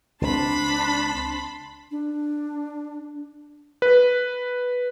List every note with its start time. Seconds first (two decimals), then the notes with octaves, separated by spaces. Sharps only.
0.21 C#2 A3 C4 D4 A5 B5 C6
1.91 D4
3.82 B4